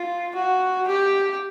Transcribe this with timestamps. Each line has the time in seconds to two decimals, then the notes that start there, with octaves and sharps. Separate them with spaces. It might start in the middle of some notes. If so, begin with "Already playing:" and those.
Already playing: F4
0.35 F#4
0.88 G4